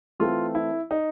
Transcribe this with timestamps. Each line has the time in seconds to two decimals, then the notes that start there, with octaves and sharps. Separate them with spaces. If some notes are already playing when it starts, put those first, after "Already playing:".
0.20 E3 A3 C4 F4
0.55 E4
0.91 D#4